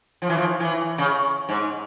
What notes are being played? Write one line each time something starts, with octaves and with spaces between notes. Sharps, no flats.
F3
E3
F3
E3
C#3
G#2